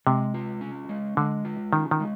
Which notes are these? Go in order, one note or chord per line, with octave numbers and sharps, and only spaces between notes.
C3 G#3
F4
C#4
G#3
D3 G#3
F4
D#3 C#4
D#3
G#3